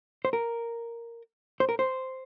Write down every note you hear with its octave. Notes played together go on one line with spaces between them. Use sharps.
C5
A#4
C5
A#4
C5